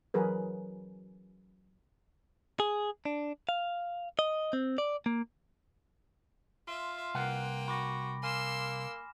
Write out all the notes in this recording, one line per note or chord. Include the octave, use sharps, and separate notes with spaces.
E3 F#3 G#4 A#4 B4
G#4
D4
F5
D#5
C4
D5
A#3
F4 E5 C6
C2 A#3 B4 F#5 G5
F#4 B5 D6 A#6
A#3 G#5 C6 E6 F6 E7